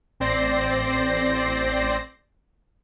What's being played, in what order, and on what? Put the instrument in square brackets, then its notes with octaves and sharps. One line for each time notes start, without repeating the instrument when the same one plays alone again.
[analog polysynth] A1 C4 C5 D5 A#6 C7